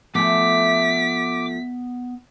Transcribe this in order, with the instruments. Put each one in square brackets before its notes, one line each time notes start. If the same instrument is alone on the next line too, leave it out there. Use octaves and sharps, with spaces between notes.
[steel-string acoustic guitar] F3 A3 [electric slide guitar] B3 G#5 [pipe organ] D6 [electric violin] B6